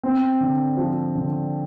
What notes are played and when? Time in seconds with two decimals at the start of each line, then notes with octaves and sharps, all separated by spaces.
0.03 C4
0.41 D3
0.77 F3
1.15 D3